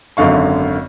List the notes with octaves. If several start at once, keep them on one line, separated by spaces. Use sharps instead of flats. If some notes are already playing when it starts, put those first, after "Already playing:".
G#1 F#2 D3 F5 C#6